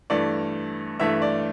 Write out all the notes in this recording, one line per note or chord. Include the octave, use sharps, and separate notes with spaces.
G2 E3 A3 D5
G2 E3 A3 E5
D5